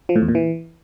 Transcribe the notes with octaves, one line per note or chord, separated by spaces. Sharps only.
F3
A2
E2
A#2
E3